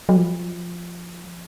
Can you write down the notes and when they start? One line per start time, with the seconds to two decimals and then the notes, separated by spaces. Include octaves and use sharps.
0.09 F#3
0.17 F3